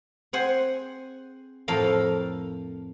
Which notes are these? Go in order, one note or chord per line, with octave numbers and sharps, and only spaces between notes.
C4 G#4 C5 F#5 G#5
F2 A2 A4 A#4 F5